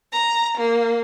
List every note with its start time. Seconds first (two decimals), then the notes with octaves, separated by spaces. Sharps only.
0.11 A#5
0.57 A#3